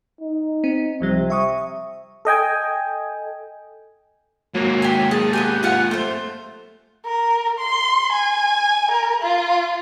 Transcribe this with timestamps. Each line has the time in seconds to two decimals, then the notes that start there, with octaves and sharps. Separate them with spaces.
0.21 D#4
0.64 C4
1.01 C#2 C3 F3 G3
1.30 E5 C#6 D#6
2.25 A4 D#5 G5 G#5
4.55 G#2 F#3 A#3
4.82 G4 G#5
5.11 G#4 A5
5.33 B3 G4 B4 G#5
5.63 F4 F5 F#5 G#5
5.91 A3 F4 C5
7.05 A#4
7.58 C6
8.12 G#5
8.91 A#4
9.22 F4